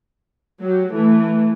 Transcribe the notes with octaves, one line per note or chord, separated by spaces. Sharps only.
F#3 G4
E3 A3